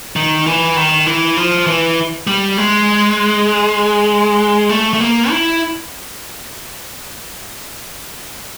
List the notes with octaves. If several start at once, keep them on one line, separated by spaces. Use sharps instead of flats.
D#3
E3
D#3
E3
F3
E3
G3
G#3
A3
A3
A#3
E4